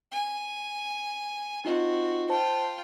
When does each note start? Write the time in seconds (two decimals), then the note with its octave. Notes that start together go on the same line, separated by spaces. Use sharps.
0.11 G#5
1.65 C4 D#4 F4 F#4 D#5
2.29 F4 C5 G5 A5